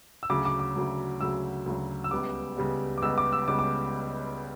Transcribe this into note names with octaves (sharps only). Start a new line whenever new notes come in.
E6
D2 C#3 F#3 D6
D6
D6
D2 C#3 F#3
D2 C#3 F#3 E6
D2 C#3 F#3
E6
C#2 C#3 G3 B3 D6
C#2 C#3 G3 B3
D6
C#2 C#3 G3 B3 E6
D6
E6
C#2 C#3 G3 B3 D6
D6